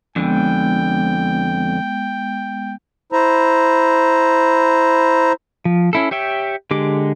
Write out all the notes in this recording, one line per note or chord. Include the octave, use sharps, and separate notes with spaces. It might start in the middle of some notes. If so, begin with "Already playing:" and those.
F2 D3 G#3 B3 G5
E4 C5 A#5
F3
C#4 E4 A4
G4 C#5 E5 G5
D3 G#3 G4 D6